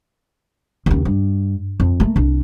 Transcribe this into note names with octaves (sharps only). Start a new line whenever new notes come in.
D#2 C#3
G2
F2
A3 A#3
C2 D4